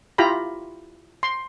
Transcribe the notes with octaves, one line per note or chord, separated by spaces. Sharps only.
E4 F4 G4 A#5 B5
C6